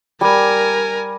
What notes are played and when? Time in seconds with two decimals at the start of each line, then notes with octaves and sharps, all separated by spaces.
0.21 G3 A#4 G#5